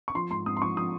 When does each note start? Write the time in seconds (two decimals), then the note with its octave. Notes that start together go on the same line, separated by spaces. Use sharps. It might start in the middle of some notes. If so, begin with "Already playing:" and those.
0.08 C#6
0.15 F3 C6
0.31 G#2 C6
0.46 G#2 D#6
0.57 C6
0.62 F3 C#6
0.77 F3 D#6